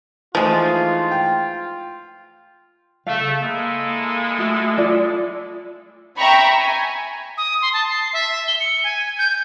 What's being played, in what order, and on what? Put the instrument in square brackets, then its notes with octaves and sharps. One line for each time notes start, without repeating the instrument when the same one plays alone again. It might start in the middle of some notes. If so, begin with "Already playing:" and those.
[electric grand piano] E3 A3 D#4 [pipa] F3 G#3 [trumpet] F4
[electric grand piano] G5
[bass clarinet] C#3 [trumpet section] A3 [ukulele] F5
[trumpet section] G#3 E4 A4 [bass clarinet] A#3
[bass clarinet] A3 [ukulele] F#4
[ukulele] F4 D5
[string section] E5 G5 A#5 B5 C#6
G#5
[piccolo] D#6
C6
A5
C7
E5
G7
C#7
G#5
G6